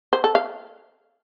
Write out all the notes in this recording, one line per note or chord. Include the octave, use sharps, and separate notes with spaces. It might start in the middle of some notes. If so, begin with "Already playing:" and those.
C5
A4
F5